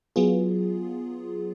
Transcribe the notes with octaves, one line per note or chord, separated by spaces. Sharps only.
F#3 B3 F4 G#4